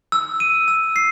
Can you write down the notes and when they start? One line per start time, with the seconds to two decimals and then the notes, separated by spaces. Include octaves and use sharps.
0.12 E6
0.40 D#7
0.68 E6
0.96 C7